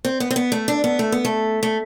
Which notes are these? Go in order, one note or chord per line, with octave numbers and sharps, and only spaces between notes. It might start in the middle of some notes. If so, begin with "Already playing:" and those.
C4
B3
C4
B3
A3
D4
B3
A3
B3
A3
A3